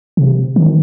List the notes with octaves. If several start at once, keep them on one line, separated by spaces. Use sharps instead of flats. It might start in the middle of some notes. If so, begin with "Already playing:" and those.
C3
D#3